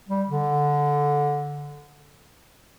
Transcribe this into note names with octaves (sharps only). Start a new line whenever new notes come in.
G3
D3